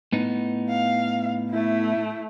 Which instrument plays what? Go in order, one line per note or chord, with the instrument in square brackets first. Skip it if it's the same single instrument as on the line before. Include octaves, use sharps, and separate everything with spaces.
[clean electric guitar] A2 B3 D#4
[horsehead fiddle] F5
A3 E4